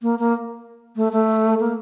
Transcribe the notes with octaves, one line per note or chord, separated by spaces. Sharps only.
A#3
A#3
A3
A3
A#3